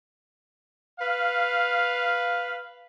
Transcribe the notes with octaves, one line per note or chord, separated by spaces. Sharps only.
B4 F5